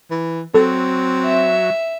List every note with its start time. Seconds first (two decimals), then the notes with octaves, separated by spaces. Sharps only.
0.11 E3
0.54 F#3 C4 A4
1.25 E5